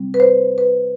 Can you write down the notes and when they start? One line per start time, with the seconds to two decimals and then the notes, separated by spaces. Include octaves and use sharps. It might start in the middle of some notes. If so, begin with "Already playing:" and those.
Already playing: C3 G3 C4
0.14 B4
0.20 C5
0.58 B4